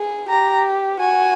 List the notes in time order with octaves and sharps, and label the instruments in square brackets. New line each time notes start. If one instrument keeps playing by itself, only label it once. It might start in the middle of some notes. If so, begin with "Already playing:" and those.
Already playing: [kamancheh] G#4
[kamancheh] G4 [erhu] A#5
[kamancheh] F#4 [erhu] G#5